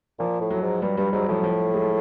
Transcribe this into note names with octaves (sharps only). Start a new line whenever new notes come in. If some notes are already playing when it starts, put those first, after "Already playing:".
A#2 F3
A2
F#3
G#2
G2 G3
G2 G3
G#2 F#3
A2 F3
F3
G#3